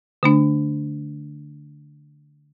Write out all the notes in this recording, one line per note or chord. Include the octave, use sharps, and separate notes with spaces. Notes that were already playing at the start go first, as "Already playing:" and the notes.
D3 A3 D4